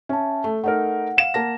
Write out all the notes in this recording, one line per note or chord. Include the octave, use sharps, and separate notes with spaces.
C#4 E5 A5
A3
A3 D#4 A#4 F#5
F5 E7
A#3 A5 A#6